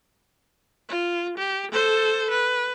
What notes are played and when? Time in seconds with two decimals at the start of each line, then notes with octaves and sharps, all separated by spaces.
0.89 F4
1.38 G4
1.72 A4 C5
2.30 B4